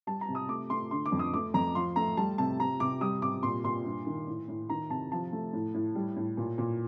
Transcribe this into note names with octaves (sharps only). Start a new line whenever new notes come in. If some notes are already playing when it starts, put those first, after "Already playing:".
G3 A5
A#5
C3
D#6
A3 D6
A3 C6
D3 C6
D6
F2
D#6
A3 D6
F2 A#5
F3 C6
A3 A#5
G3 A5
C3 A5
C3 A#5
C3 D6
G3 D#6
C3 D6
A#2 C6
A#2 C6
G2
D#3
A2
A2
D#3 A#5
C3 A5
F3 A5
A3
A2
A2
G3
A2
A#2
A#2